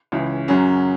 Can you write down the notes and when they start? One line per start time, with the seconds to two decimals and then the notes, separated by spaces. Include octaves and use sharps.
0.12 C#2 C#3 E3 C#4
0.48 F#2 C#3 F#3 C#4